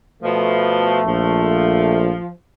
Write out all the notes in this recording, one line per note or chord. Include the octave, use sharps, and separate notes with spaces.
B2 F3 A3
A#1 F3